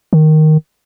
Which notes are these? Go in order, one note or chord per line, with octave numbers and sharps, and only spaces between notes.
D#3